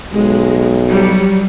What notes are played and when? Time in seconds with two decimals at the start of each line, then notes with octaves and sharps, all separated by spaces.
0.13 B1 G#3
0.87 F#3 G3